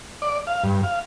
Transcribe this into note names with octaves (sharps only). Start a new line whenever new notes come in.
D5
F5
G2
F5